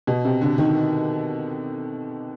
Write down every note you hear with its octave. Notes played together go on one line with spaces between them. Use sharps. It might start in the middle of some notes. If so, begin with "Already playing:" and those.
B2
C3
D3
D#3